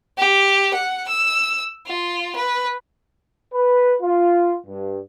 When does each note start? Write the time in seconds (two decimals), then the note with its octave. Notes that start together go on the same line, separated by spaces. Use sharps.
0.18 G4
0.74 F#5
1.08 E6
1.86 F4
2.36 B4
3.53 B4
4.02 F4
4.67 G2